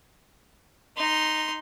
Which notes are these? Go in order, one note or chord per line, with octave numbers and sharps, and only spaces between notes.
D#4 C6